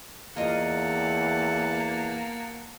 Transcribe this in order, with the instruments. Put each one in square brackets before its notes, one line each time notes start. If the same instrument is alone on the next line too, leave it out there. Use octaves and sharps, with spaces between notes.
[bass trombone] E2 [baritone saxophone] A#3 [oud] F4 D#5 [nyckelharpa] F#5 A5